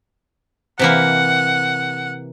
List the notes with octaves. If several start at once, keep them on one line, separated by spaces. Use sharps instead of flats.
C3 E3 A#3 F#5